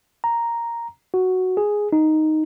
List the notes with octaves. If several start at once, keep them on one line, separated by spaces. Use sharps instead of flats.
A#5
F#4
G#4
D#4